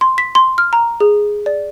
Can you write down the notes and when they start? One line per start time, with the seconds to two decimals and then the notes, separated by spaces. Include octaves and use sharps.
0.01 C6
0.18 B6
0.35 C6
0.58 F6
0.73 A#5
1.00 G#4
1.46 D5